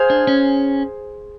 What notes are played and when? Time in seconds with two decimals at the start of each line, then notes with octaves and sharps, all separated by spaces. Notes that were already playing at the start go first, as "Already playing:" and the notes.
Already playing: G#4 C5 F5 G#5
0.10 D4
0.27 C#4